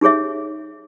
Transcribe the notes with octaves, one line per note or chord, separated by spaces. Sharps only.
D#4 G4 G#4 C#5 E5